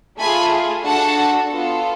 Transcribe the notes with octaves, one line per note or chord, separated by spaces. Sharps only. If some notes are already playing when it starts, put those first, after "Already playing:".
A3 F4 G#4 G#5 B5
D4 F#4 A4 F#5 A5
B3 F4 A4